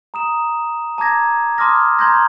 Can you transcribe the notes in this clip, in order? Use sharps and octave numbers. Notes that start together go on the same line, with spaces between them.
A#5 D#6 E7
A5 A#5 D6 G#6 A#6
A5 C6 D6 D#6 F6 A#6
A#5 C6 G6 G#6 A#6